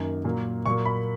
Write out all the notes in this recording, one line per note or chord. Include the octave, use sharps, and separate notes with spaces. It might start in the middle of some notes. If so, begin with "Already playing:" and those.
Already playing: F#2 D#3 A#3
A#2 F#3 A#3
A#2 F#3 A#3 C#6
B5